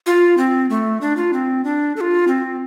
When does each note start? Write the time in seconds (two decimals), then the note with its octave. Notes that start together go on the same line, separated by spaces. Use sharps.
0.06 F4
0.38 C4
0.70 A3
1.01 D4
1.17 F4
1.33 C4
1.65 D4
1.96 A4
2.01 F4
2.28 C4